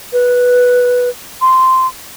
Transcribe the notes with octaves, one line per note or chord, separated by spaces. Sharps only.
B4
C6